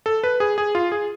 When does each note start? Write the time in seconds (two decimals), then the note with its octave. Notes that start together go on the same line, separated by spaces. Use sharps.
0.06 A4
0.24 B4
0.40 G#4
0.58 G#4
0.75 F4
0.92 G#4